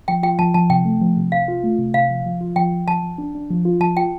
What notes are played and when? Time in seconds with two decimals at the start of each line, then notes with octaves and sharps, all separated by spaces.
0.08 F3 G5
0.23 F4 G5
0.39 F3 A5
0.54 F3 A5
0.70 C3 G5
0.85 A3
1.01 F3
1.17 C3
1.32 C3 F5
1.48 F4
1.64 A3
1.78 C3
1.94 C3 F5
2.10 F3
2.26 F3
2.41 F4
2.56 F3 G5
2.72 F3
2.88 F3 A5
3.03 F3
3.18 D4
3.35 D4
3.50 F3
3.65 F4
3.80 F3 A5
3.97 F4 G5